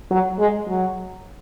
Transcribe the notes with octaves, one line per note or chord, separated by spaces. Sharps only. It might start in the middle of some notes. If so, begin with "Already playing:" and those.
F#3
G#3
F#3